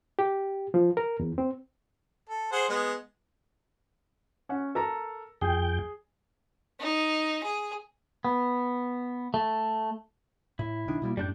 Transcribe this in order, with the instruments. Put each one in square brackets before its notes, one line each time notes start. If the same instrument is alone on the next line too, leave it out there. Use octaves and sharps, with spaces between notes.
[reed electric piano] G4
F3
A#4
E2
C4
[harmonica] A4
G#4 C5 F#5
G#3 B3
[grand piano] C#4 F#5
A4 A#4 A#5
[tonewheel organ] F2 G5 [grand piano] G#4
[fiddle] D#4
G#4
[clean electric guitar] B3
A3
[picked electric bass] A2 [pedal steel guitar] E4
[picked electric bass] B1 D#3 D4
B2 G3 A#3
[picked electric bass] F#2 A2 [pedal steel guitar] G3 D4 G6